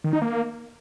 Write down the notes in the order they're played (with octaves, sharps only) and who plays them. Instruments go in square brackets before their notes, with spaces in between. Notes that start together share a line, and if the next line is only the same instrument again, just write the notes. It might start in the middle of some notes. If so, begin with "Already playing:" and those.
[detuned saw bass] D#3
D#4
A#3